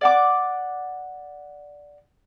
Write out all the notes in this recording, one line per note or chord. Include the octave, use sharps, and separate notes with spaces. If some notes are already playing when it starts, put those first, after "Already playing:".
D5 F#5 D6